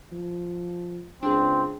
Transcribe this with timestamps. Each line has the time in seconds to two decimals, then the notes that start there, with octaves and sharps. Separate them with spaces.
0.12 F3
1.23 C#2 C4 D4 G#4